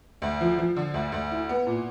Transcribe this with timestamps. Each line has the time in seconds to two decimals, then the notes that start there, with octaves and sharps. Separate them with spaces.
0.22 D2
0.41 F3
0.58 F3
0.76 D3
0.94 D2
1.12 D2
1.31 E4
1.49 B3
1.67 A#2